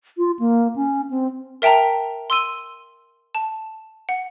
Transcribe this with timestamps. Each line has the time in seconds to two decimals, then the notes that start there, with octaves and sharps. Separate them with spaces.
0.18 F4
0.39 A#3
0.76 C#4
1.10 C4
1.62 A#4 E5 G5 A5 A#5
2.30 C6 E6 D#7
3.35 A5
4.09 F#5